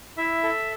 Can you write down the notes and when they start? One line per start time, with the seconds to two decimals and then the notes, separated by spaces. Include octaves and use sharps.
0.17 E4 E5
0.43 A4